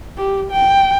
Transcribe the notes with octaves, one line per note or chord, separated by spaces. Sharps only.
G4
G5